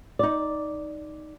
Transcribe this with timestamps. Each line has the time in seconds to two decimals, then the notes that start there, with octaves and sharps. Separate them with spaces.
0.19 D#4 D5